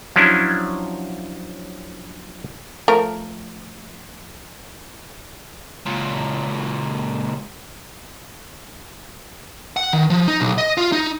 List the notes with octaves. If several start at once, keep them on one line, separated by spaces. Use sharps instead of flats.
F3 F#3 C#4 D4 E4
F3 A3 A#4
C#2 A#2
F#5
D#3
F3
D#4
B1
D#5
F4
D#4